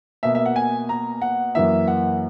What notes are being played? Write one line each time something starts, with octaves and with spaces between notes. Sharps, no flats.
B2 A#3 E5
E5
F#5
G#5
A#5
F#5
F#2 E3 A#3 E5
F#5